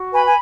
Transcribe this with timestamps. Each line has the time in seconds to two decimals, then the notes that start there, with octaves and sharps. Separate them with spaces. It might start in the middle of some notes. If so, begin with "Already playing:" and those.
Already playing: F#4
0.13 B4 G#5 B5
0.24 G#5